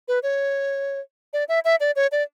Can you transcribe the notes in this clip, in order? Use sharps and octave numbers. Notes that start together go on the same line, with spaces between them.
B4
C#5
D5
E5
E5
D5
C#5
D5